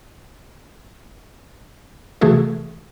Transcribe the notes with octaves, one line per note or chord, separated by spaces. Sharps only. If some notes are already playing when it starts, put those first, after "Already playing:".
C3 E3 A3 F#4 G#4 A4